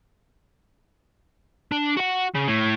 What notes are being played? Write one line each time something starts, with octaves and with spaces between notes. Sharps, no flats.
D4
F#4 F#5
C#3
A2